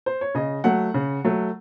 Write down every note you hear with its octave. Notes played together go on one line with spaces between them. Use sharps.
C5
C#5
C#3 D#5
F#3 A3 F#5
C#3
F#3 A3